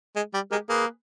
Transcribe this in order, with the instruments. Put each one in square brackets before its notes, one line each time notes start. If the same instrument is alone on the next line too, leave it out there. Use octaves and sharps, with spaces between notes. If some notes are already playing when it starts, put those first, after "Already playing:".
[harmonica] G#3
G3
[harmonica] G#3 [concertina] G4 A#4
[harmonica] A#3 [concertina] G#4 B4